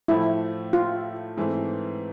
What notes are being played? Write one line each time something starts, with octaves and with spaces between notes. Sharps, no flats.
A2 F3 A3 E4
F4
G#2 E3 A3 C4